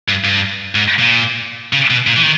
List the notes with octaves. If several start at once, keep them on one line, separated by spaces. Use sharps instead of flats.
G2
G2
G#2
A#2
C#3
B2
A#2
E3
D#3